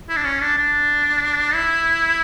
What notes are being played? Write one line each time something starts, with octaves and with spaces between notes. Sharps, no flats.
E4
D4
C#4
D4
D4
E4